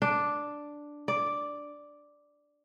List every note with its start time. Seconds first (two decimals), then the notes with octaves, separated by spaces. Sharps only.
0.02 D4
1.08 D5